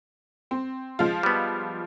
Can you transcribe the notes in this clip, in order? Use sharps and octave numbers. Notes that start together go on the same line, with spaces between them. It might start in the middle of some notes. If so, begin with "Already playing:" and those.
C4
F3 G#3 F4
G3 B3